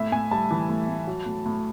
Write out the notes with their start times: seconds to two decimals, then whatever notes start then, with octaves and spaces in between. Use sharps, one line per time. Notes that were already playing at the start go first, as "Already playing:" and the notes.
Already playing: A2 E5
0.12 A2 G#5
0.31 G3 A5
0.51 E3
0.69 A2
0.89 A2
1.07 F#3
1.26 A2
1.46 A2